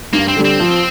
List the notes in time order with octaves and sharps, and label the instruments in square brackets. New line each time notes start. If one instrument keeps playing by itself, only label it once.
[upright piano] G2 [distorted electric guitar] A#3
[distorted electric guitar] C4
[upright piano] D3 G3
[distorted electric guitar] C4
[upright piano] F3